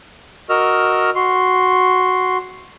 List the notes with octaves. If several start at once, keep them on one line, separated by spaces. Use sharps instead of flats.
F#4 A#4 D#5 E6 F6
F#4 C6